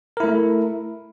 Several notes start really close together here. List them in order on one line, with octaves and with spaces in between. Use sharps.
A#4 E4 A3